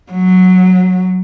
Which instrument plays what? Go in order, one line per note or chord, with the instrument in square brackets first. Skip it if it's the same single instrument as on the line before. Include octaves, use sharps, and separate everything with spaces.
[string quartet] F#3